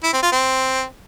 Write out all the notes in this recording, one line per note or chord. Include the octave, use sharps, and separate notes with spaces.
E4
C4
F4
C4